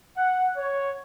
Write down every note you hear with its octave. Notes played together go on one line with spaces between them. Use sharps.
F#5
C#5